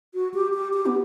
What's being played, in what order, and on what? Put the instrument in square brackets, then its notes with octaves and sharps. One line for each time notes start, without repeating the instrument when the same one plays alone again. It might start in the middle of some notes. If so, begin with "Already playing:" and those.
[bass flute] F#4
G4
G4
G4
B3